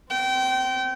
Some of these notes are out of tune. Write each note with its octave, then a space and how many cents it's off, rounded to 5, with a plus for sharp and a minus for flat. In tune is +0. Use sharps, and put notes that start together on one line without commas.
C4 +0 G5 -30